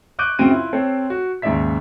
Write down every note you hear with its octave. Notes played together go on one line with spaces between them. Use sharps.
C#6 D6 F#6 G6 D7 D#7
F#2 C#3 C4 F#4 D7 D#7
E4 F4
C4 A4 C5 C#5
F#4
D#2 G#2 C#3 D5 E5 B6